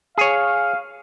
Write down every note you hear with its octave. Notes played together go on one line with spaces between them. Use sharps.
G#4 C#5 F5